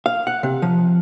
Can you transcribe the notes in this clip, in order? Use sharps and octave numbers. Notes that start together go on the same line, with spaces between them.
F5
F#5
C3
F3